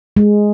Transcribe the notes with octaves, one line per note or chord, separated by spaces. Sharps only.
G#3